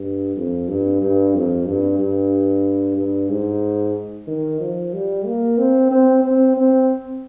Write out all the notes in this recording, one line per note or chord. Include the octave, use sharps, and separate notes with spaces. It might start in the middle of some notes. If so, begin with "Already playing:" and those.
Already playing: G2
F2
G2
G2
F2
G2
G2
G2
G#2
D#3
F3
G3
A#3
C4
C4
C4
C4